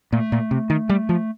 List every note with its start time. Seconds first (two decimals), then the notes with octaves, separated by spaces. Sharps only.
0.13 A#2 A3
0.32 A#2
0.51 C3
0.70 D#3
0.89 G3
1.09 F3